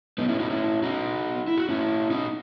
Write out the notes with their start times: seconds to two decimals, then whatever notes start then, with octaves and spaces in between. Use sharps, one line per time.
0.18 B3 D#4
0.29 C#4 E4
0.40 D#4 F#4
0.51 C#4 E4
0.83 D#4 F#4
1.48 E4
1.58 F#4
1.69 C#4 E4
2.11 D#4 F#4